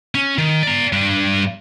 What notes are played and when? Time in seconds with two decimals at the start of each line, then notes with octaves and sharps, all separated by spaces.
0.15 C#4
0.38 D#3
0.63 D5 A#5
0.93 G2 D4